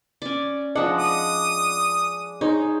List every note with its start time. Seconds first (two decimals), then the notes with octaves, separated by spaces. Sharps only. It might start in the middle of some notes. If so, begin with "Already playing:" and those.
0.22 C#4 D5
0.76 F3 G#3 D4 D#5 F#5
0.99 D#6
2.41 D#4 G#4 C5 C#5